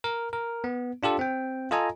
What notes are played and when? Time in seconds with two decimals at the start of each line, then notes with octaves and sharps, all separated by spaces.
0.04 A#4
0.33 A#4
0.64 B3
1.03 D4 F4 G4 A4
1.19 C4 G5
1.71 F4 A4 D#5 G#5 A#5